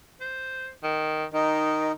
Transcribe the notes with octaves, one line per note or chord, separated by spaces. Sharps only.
C5
D#3
D#3 D#4